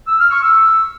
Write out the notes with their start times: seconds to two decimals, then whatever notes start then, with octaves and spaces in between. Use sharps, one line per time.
0.08 E6
0.20 F6
0.31 C#6
0.43 E6